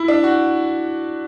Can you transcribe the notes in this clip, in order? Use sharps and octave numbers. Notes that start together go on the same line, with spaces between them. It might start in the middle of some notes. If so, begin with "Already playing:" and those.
Already playing: E4
D4
F#4